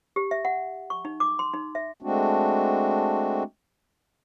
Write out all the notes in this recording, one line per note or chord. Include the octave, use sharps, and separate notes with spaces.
G4
E5
F#5
C#6
D#4
D6
C6
D#4
E5
G#3 A3 C4 D4 F#4